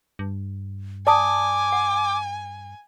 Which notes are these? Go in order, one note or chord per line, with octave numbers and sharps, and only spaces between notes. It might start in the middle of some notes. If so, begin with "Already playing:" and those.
G2
D5 G#5 A5 D6 D#6
F#5